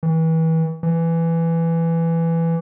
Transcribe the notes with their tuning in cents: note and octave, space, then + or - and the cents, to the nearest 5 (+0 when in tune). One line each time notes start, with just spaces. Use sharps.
E3 -30
E3 +10